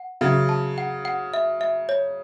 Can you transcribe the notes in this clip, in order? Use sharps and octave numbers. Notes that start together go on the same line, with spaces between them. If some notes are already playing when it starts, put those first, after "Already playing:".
Already playing: F#5
C#3 F#3 E5
A5
F#5
F#5
E5
E5
C#5